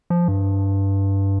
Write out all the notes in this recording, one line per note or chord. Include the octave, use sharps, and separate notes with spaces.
F3
G2